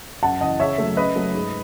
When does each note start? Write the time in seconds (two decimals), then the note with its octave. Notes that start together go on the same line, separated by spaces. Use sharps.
0.23 F#2 F#5 A5
0.41 C#3 E3 D#5 F#5
0.60 C#3 C#5 E5
0.78 F#3 A3
0.97 C#3 B4 D#5
1.16 F#3 A3
1.34 G#2